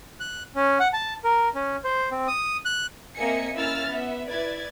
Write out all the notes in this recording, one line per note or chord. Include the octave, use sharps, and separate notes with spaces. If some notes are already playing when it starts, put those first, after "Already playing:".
F#6
C#4
F#5
A5
A#4
C#4
C5
C4
D#6
F#6
A#3 C4 D#5 E5 G#5 C#7
A#3 C#4 E4 E6 F6 A6
B3 E5
E4 B4 D5 G#6 A6